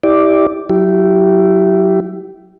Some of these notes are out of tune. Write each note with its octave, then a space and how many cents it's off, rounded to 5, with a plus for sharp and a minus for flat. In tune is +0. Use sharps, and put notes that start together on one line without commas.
E4 -30 G4 +0 D5 +0
F#3 +0 E4 +15 G4 -20